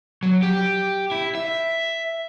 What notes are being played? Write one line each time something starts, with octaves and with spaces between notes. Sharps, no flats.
F#3
G4
E4
E5